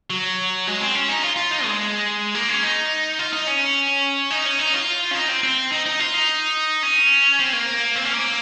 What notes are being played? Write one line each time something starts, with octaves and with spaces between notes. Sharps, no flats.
F#3
G#3
C4
C#4
D#4
F4
F4
D#4
G#3
A#3
C#4
D#4
F4
D#4
C#4
D#4
C#4
D#4
F4
C#4
D#4
C4
C4
D#4
D#4
F4
D#4
C#4
C4
A#3
C4
C#4
A#3